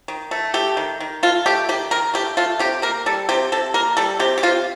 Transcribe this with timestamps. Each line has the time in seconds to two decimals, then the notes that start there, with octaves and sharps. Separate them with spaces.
0.08 D#3
0.31 A3
0.54 A3 G4
0.77 D#3
1.00 D#3
1.23 A3 F4
1.46 A3 G4
1.69 D#3 G4
1.91 D#3 A#4
2.14 A3 G4
2.37 A3 F4
2.59 C3 G4
2.82 A#3 A#4
3.06 G3 A4
3.29 C3 G4
3.52 C3 A4
3.74 A#3 A#4
3.97 G3 A4
4.19 C3 G4
4.38 G4
4.43 C3 F4